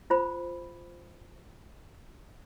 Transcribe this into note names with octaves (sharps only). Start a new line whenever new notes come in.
F4 C5 B5